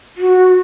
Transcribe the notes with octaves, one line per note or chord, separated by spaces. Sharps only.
F#4